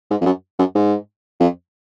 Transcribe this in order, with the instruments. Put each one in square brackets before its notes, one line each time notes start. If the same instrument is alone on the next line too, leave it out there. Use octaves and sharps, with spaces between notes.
[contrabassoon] G#2
F2
F#2
F#2
G#2
F2